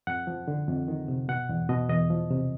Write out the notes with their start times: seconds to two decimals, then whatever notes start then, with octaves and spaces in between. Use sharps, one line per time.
0.07 F2 F#5
0.27 F3
0.48 D3
0.68 F2
0.88 D#3
1.08 C3
1.29 B2 F#5
1.49 E2
1.69 B2 D#5
1.89 E2 D#5
2.10 F3
2.30 C3